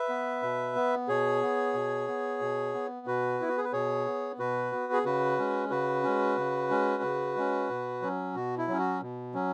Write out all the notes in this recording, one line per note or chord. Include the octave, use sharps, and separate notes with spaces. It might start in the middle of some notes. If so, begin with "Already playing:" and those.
Already playing: B4 E5
B3
B2
B3
B2 G#4 C#5
B3
B2
B3
B2
B3
B2 F#4 B4
B3 E4
F#4
G#4
B4
B2 G#4 C#5
B3
B2 F#4 B4
B3
G#4
C#3 F#4 B4
G#3 C#4
C#3 F#4 B4
G#3 C#4
C#3
G#3 C#4
C#3
G#3 C#4
B2
F#3 C#4
B2 F#4
E4
F#3 C#4
F#4
B2
F#3 C#4